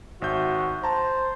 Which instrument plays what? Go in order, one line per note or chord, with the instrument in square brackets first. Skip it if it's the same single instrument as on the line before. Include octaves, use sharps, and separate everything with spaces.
[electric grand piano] G#1 E5 G6 [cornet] F#4
[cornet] C5 [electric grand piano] A5 A#5